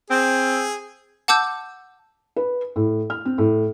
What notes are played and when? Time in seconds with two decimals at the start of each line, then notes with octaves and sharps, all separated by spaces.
0.10 C4 G#4
1.28 F#5 A5 D6 E6 G6
2.36 B4
2.76 A2
3.10 F6
3.25 C4
3.38 A2